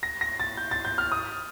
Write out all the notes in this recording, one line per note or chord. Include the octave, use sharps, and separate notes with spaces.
A#6
A#6
A6
G6
A6
G6
F6
D#6